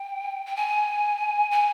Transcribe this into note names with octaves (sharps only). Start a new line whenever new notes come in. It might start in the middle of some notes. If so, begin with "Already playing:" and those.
Already playing: G5
G5
G#5
G#5